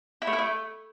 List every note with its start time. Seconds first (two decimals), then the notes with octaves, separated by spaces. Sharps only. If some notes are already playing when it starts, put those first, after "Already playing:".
0.22 E4
0.27 A3
0.33 E4
0.38 A3